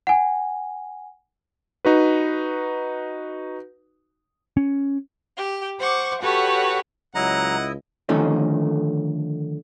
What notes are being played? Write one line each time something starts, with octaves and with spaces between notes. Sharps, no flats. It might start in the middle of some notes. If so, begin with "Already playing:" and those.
F#5 G#5
D#4 F#4 B4
C#4
G4
C5 F#5 C#6 D6
F#4 G4 A4 B4 C#5 F#5
C#2 F#3 E4 D#5 F#5 A#5
D3 D#3 F3 A3 C#4 D#4